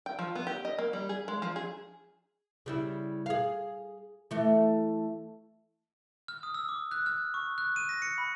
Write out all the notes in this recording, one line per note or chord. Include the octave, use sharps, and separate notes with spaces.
G5
F3
B3
G4
D#5
A#3
G3
G#4
G#3
F3
G#4
C#3 G3 E4
G#4 F5
E3 A3
F6
D#6
E6
D6
F#6
F6
C#6
F#6
D#7
A#6
C#7
B5